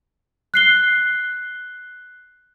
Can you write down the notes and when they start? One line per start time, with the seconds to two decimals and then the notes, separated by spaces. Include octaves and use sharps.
0.54 F#6 C7 G7